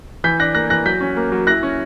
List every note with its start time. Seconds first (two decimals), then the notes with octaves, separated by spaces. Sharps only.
0.24 E3 G6 B6
0.40 D4 F#6 A#6
0.55 A#3 F#6 A#6
0.70 E3 F#6 A#6
0.86 F#3 G6 B6
1.01 C#4
1.17 A#3
1.32 F#3
1.47 E4 F#6 A#6
1.63 C#4